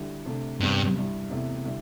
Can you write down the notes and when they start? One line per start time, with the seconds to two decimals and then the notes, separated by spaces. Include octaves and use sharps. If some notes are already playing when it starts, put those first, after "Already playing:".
Already playing: D3 G3 E4
0.26 C3 A3 D4
0.60 E2 G2 C3 G3 C4
0.96 G2 G3 E4
1.30 E2 C3 A3 E4
1.65 D3 G3 E4